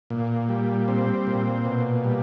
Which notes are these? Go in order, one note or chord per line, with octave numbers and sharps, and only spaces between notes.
A#2
G3
C4
A#2
B2
G3